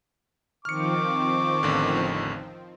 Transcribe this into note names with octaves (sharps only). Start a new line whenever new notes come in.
D#3 F3 C4 C#6 D6 F6 C#7
A1 E2 D3